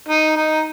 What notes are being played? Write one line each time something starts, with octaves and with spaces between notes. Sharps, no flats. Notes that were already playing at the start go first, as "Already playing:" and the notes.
D#4
D#4